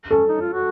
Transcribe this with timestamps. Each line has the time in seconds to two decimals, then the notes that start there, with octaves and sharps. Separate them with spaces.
0.10 C#4 A4
0.29 D#4
0.41 F4
0.53 F#4